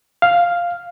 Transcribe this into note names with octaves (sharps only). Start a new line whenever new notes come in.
F5